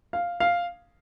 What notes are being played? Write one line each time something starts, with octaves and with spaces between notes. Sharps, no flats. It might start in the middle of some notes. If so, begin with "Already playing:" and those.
F5
F5